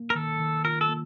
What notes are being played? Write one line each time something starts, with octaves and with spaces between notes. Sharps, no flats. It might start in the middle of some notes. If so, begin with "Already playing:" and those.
Already playing: A#3
A#4
D#3 A4
D#3
F4 A#4
A4
A#3